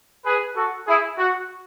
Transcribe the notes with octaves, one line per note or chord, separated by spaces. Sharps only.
G#4 B4
F#4 A4
E4 G#4
F#4